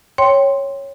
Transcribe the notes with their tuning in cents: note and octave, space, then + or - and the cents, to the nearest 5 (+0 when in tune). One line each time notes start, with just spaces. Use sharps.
C#5 -5 G5 +0 C6 +0